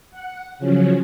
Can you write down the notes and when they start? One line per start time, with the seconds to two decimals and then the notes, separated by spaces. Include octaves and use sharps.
0.10 F#5
0.58 C#3 F3 F#3 C#4